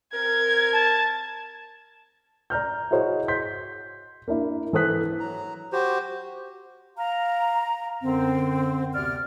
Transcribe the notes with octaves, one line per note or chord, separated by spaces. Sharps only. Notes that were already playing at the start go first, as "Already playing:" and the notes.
C4 A#4 G#6
A5
D5 A#5 F6 G6
E4 F#4 G#4 C5 C#5 D#5
C6 G6 B6
A#3 D4 E4
E3 A4 C5 D#6 F#6 B6
F#3 A#5
F#4 G4 C5
F5 A#5
F#2 D3 C4
D2 C3 B3 D5 F6